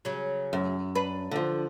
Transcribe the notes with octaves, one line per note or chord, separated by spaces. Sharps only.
C#3 F#3
F#2
D4 B4
D3 F3